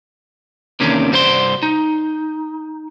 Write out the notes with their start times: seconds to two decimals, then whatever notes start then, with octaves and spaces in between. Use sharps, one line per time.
0.80 E2 C3 D#3 A#3 C#4 D4
1.11 C2 G2 F#4 C5 D5 C6
1.63 D#4